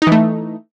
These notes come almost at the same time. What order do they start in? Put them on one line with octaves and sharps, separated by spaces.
D#4 E3 A3